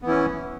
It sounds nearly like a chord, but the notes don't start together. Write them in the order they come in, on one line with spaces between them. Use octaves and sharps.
B3 E3 E4 C#4